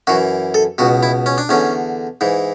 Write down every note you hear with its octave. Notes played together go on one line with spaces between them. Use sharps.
F#2 E3 F#4
A4
C#2 B2 F#4
E4
C#4
D4
E2 D3 C#4
G#2 E3